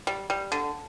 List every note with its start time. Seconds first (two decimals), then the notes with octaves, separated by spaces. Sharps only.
0.07 G3
0.30 G3
0.52 D3